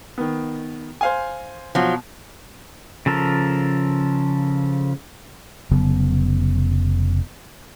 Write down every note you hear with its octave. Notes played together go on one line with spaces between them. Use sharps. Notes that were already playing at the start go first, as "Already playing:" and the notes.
D#3 B3
C5 F5 G#5
B2 F3 F#3
C#3 F3 A4 A#4
F1 C#3 F#3 B3